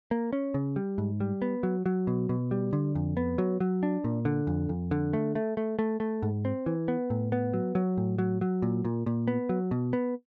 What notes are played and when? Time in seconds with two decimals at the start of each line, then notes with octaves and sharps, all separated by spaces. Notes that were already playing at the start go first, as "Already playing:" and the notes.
0.11 A#3
0.33 C#4
0.54 C#3
0.76 G3
0.98 G#2
1.20 G3
1.42 B3
1.63 F#3
1.86 F#3
2.07 B2
2.29 B2
2.51 G3
2.73 D3
2.95 F2
3.17 B3
3.38 F#3
3.60 F#3
3.83 D4
4.04 A#2
4.25 D3
4.47 F2
4.69 F2
4.91 D3
5.13 A3
5.35 A3
5.57 A3
5.79 A3
6.00 A3
6.22 G#2
6.45 C4
6.66 E3
6.88 B3
7.10 A2
7.32 B3
7.54 F#3
7.75 F#3
7.97 A2
8.18 F#3
8.41 F#3
8.62 A#2
8.85 A#2
9.06 A#2
9.28 B3
9.49 F#3
9.71 B2
9.93 B3